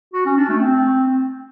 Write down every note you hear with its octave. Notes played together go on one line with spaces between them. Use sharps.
F#4
C#4
D4
A3
C4